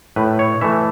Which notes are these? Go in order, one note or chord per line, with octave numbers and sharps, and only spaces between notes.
A2 B4
C#5
E3 A3 E5